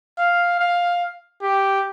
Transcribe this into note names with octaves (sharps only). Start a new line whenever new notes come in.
F5
F5
G4